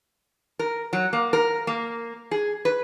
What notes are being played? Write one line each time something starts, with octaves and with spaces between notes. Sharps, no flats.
A#4
F#3
A#3
A#4
A#3
G#4
B4